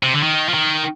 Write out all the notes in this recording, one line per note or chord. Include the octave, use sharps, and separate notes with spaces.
C3
D3
D#3
F3
D#3